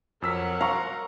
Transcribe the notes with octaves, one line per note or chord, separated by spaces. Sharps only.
F2 F#3 A#4 F#5 E6 B6
F5 A#5 C6 C#6